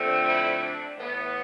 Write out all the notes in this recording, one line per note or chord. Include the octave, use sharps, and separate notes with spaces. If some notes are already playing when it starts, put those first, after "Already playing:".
Already playing: D3 F3 A3 C4
E4
D4
A2 E3 B3